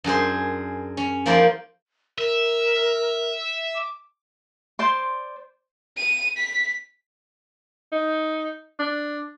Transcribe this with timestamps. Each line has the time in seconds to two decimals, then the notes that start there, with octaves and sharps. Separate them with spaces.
0.04 F#2 D4 G#4 C5
0.97 C#4
1.26 F3 A#3 D#4 E4 C5 D5
2.18 A#4 E5
3.75 D6
4.79 C5 D5 C6
5.97 D#7
6.37 B6
7.92 D#4
8.80 D4